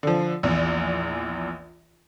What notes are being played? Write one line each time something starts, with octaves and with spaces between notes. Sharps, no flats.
D3 F3
A#1 E2